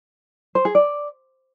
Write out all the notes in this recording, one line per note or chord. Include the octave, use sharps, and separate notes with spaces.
C5
G#4
D5